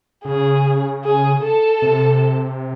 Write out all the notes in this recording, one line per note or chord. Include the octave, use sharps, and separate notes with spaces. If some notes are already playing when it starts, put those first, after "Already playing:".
C#3 G#4
G#4
A4
C3